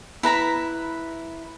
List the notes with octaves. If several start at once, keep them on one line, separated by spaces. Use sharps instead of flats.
E4 B4 A#5 B5